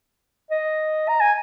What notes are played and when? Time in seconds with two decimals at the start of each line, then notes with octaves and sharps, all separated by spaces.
0.51 D#5
1.09 A#5
1.20 G#5